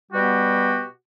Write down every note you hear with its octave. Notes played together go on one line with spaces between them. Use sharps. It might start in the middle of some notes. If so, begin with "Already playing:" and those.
B2 G3 B3 F#4 G4